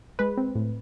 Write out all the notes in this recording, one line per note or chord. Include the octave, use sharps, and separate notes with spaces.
G#3 B4
C4
A2